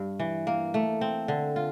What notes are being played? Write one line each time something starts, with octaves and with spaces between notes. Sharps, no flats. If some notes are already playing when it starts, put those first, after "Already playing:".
Already playing: G2
E3
A#3
A3
C4
D3
F4